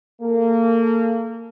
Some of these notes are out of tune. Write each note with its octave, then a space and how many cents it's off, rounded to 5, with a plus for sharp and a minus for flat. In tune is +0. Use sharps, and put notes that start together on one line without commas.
A#3 -25 A4 -25